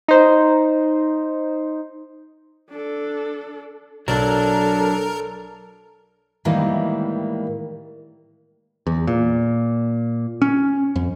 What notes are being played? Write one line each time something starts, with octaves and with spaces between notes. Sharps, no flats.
D#4 C5
D4 A4
B1 F#3 D4 A4 A#4
A2 D#3 E3 G3 G#3 A#3
E2
A#2
C#4
F2